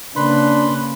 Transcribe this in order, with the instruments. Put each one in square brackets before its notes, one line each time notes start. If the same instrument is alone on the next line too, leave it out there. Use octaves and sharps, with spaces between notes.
[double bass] C#3 A#3 [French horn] D4 [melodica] B4 B5 C6